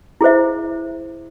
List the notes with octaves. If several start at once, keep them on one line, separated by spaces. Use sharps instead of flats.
E4 G#4 C5 E5